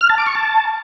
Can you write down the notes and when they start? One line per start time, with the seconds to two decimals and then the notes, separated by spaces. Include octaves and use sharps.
0.01 F6
0.09 A5
0.18 D6
0.27 C#6
0.35 A5